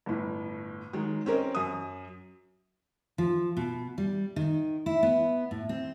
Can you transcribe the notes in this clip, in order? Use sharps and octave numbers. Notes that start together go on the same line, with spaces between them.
G1 A2
D#3 F#3 G#3
C4 C#4 A#4 D#5
F#2 D#6
F3
B2
G3
D#3
E4
B3
A2
C4